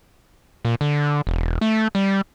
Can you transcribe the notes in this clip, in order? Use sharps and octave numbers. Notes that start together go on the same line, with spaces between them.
A#2
D3
E1
A3
G3